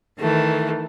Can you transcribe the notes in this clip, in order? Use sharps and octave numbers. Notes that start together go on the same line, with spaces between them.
D#3 E3 A3